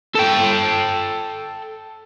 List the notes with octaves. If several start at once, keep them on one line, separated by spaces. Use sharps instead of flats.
A4 G5